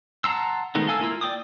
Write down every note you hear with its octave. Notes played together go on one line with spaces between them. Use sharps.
F#5 A5 A#5 C6 E6
D#3 G#3 A3 B3 D#4
A4 F5 G#5 E6
A#3 E4 F4 E6
D5 G5 D6 D#6